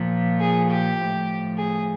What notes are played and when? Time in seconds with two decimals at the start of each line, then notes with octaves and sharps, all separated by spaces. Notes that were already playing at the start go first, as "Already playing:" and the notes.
Already playing: A#2 F3
0.41 G#4
0.70 G4
0.99 A2 F3
1.57 G#4